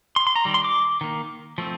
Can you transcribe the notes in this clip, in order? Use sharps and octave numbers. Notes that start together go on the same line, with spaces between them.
C6
C6
A#5
D#3 G3
C6
D6
D#3 A#3
F3 A3 C4